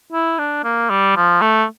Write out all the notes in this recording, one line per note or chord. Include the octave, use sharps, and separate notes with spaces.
E4
D4
A#3
G3
F3
A3